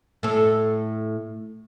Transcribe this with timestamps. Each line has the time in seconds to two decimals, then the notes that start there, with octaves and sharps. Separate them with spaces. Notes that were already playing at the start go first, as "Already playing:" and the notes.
0.23 A2 A4